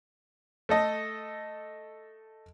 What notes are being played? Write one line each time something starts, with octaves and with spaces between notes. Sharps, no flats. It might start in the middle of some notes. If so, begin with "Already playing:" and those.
A3 A4 D#5